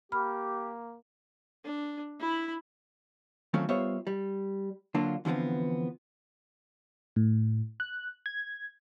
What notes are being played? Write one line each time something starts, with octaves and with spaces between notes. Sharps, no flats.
A#3 G4 B5 F6
D4
E4 B5
D#3 F#3 A3 C4 C#4 F4
G3 B3 F4 C5 C#5 E5
G3
D3 F#3 A#3 D4 F4
E2 D3 F3 B3 C4
A2
F#6
G#6